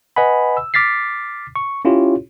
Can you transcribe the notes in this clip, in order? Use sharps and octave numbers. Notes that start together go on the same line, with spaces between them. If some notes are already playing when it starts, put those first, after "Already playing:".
B4 D#5 F#5 G#5 B5
E6
D6 F6 A6 B6 C7
C#6
C#4 E4 F4 G4 C#5